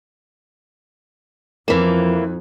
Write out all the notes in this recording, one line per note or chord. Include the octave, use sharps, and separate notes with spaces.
F2 E3 A#3